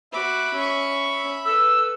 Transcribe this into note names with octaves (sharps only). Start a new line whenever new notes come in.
F#4 E5 B5 D6
C#4 C#6
A4 B4 E6